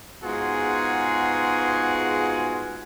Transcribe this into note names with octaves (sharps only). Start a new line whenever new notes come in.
G#2 B3 F4 F#4 G#4